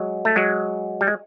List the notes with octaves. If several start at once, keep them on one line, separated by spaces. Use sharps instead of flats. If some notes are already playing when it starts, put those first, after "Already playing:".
Already playing: F#3 G#3
A3
F#3 G#3
G3
G#3